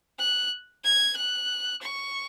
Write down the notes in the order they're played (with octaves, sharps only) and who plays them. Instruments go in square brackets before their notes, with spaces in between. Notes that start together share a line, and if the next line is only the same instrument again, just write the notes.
[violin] F#6
G#6
F#6
C#6